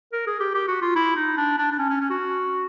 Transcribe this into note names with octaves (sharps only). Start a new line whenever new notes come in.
A#4
G#4
G4
G4
F#4
F4
E4
D#4
D4
D4
D4
C#4
C#4
C#4
F#4